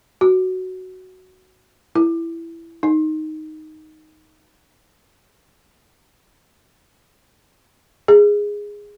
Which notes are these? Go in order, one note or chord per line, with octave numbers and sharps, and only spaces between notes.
F#4
E4
D#4
G#4